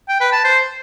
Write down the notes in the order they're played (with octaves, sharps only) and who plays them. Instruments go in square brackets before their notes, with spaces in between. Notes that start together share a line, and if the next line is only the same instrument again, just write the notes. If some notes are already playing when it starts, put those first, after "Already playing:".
[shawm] G5
B4
A5
C5